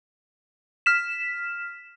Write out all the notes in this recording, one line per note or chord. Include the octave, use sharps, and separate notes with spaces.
F6 B6 E7